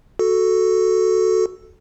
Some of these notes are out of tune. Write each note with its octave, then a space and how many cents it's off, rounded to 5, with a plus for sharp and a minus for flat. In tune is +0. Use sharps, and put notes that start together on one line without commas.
F#4 +0 A4 +0